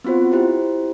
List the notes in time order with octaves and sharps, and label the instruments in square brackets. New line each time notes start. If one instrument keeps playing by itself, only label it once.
[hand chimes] B3 C4 F4 F#4 C5
E4 G4 C5